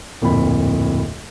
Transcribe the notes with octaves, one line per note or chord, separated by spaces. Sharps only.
D1 F2 A#2 B5